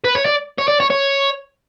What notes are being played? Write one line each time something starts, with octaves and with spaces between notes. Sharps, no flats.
B4
C#5
D5
C#5
D5
C#5
C#5